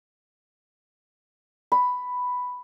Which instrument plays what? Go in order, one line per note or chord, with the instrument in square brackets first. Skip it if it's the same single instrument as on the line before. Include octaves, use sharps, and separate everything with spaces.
[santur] B5